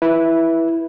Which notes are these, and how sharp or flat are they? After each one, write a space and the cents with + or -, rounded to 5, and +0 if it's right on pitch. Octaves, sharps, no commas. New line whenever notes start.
E4 +0 B4 -15